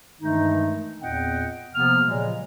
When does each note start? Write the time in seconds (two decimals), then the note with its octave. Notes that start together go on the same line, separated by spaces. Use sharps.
0.21 G2 D#3 E3 G#3 A3 D#4
1.02 E2 A#2 C4 D#5 F#5 G5
1.73 C3 F3 A#3 B3 F6
2.05 A#2 C#3 F3 F#3 G#3